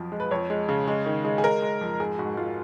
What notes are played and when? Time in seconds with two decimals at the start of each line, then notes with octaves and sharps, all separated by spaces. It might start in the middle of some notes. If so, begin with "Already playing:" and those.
Already playing: F2 F3 F#3
0.12 G#3
0.20 B4
0.31 F2 C#5
0.50 G#3
0.69 C#3
0.88 G#3
1.06 D#3
1.25 G#3
1.38 G#4
1.43 G#3 A#4
1.62 G#3
1.81 F2
2.00 G#2 G#4
2.18 G#2 F#4
2.37 G#2 F4